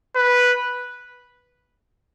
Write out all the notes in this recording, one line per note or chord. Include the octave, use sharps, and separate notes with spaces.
B4